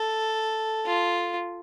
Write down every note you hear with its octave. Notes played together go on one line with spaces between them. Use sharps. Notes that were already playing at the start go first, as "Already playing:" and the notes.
Already playing: A4
F4